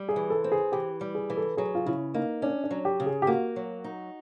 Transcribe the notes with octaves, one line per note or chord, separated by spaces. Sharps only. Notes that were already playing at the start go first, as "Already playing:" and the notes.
Already playing: G3
G#4
E3
A4
C4
G#4
E3 G4
G3
G#4
E3
A4
F#3 G#4
F4
C#3 E4
A#3 D#4
C#4 D4
D4
F#3
G4
C#3
G#4
G4
A#3 F#4
F#3
D#4